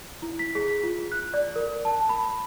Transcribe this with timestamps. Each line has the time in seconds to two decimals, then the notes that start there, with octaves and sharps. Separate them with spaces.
0.22 E4
0.39 B6
0.55 G#4
0.83 F4
1.12 F#6
1.34 D5
1.56 A#4
1.85 A5
2.09 B5